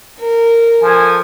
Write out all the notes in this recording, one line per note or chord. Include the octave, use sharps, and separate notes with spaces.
A#4
F3 A4 G#5